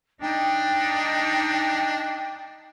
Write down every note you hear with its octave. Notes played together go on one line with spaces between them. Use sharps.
D4 D#4 G5